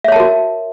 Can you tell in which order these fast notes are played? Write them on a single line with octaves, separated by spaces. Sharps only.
E5 C#5 A5 A#4 F#4